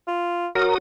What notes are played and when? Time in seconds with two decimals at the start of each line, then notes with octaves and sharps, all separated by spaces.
0.08 F4
0.55 F#3 F#4 A#4 D#6